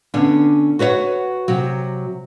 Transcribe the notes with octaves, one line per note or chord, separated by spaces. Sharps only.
D3 B3 C#4 D4
F#4 B4 C#5 D#5 F#5
C3 F#3